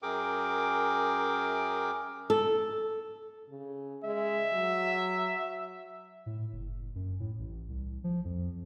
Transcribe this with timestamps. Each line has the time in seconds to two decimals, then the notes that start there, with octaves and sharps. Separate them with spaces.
0.02 F#2 G#4 A#4 G5 D6
2.30 A4
3.49 C#3
4.04 G#3 E5
4.53 F#3
6.26 A2
6.53 F#1
6.95 F#2
7.20 A2
7.39 A1
7.69 C2
8.04 F3
8.25 F2